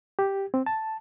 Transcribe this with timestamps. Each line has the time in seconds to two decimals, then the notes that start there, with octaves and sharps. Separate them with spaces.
0.19 G4
0.54 C4
0.66 A5